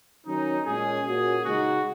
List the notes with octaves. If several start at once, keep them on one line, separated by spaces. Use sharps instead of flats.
D#3 F#3 C#4 D#4
A#2 G#3 C#4 G#4
A#2 A#3 C#4 F#4 G#4
C#3 G#3 D#4 F#4